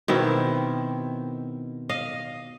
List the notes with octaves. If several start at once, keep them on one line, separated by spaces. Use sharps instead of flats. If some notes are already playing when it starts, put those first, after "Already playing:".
B2 D#3 C4 E4
D#5 F5